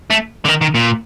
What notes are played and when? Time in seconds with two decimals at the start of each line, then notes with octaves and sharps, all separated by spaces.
0.10 A3
0.45 D3
0.48 D#3
0.61 D#3
0.75 A#2